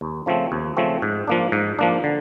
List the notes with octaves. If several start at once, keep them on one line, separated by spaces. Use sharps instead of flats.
D#2
C#3 F3 A3 C4
D#2
C#3 F3 A3 C4
G#2
F3 A#3 D4
G#2
F3 A#3 D4
D3